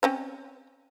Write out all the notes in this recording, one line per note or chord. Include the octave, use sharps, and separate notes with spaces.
C4 C#4 C#5